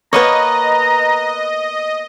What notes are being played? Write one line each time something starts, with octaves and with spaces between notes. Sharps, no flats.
A#3 B3 B4 C#5 D#5 A#5